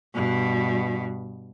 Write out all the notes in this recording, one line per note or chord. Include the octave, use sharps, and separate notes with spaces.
G2 B2